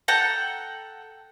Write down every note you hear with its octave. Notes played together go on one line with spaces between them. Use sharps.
A4 F#5 G5 A#5